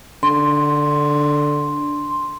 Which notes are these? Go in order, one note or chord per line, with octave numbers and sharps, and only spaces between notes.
D3 C6